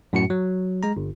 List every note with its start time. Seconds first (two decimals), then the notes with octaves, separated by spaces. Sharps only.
0.13 F#2 A2 F#4 C#7
0.30 F#3
0.83 G#3 A#5
0.97 G1